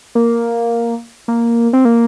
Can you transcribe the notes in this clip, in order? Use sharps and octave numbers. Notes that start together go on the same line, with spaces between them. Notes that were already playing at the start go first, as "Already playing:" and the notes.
A#3
A#3
C4
A#3